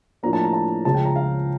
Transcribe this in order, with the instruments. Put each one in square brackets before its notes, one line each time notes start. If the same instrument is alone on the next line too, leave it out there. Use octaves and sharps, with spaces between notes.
[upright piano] A2 F3 A#3 D4 A#5
A5
A#5
A5
C#2 C#3 F3 A5
G5
A#5
F5